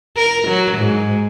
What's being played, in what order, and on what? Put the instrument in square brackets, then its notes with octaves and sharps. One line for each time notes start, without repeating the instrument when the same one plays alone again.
[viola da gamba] A#4
F#3
G#2